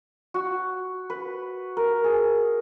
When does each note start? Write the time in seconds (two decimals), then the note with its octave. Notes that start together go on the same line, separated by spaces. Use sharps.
0.34 F#4
1.10 B4
1.77 A#4
2.04 G#4